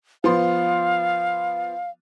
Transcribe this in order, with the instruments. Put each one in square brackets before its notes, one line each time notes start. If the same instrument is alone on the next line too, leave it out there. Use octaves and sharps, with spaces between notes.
[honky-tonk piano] F3 B3 C6 [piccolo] F5